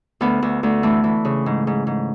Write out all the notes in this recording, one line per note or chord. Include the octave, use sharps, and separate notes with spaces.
D2 B3
D2
D2
E3 A3
E3
C#3
G#2
G#2
G#2